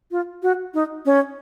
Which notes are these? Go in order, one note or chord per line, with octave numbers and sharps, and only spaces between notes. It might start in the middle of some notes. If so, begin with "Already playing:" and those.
F4
F#4
D#4
C#4